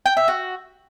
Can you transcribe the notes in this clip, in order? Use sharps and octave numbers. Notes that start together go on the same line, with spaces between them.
G5
E5
F#4